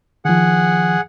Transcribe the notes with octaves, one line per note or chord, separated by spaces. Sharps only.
D#3 F3 G#4 F#5